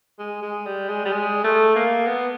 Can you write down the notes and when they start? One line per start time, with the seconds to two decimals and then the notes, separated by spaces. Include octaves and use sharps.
0.19 G#3
0.42 G#3
0.66 G3
0.89 G#3
1.05 G3
1.12 G#3
1.44 A3
1.76 A#3
2.07 B3